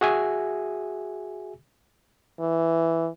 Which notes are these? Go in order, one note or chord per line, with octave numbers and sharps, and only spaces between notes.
F#4 G#4 E5 G#5
E3